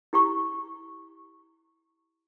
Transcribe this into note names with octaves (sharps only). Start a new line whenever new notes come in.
E4 G4 A#5 C#6